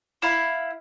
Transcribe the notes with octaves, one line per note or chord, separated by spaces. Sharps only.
E4 F5 B5